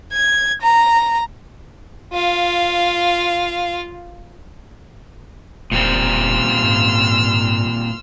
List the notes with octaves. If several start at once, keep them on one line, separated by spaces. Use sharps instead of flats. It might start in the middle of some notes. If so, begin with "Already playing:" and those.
G#6
A#5
F4 F5
E1 A#2 G3 C4 C6 E6 F6
G#2